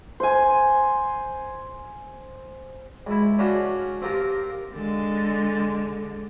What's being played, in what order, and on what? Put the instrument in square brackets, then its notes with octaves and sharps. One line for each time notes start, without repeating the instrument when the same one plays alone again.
[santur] C5 G#5
[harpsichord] C#2 E4
C#4 D4 F4 F#4
C4 F4 G4 A#4 F5
[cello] D3 G#3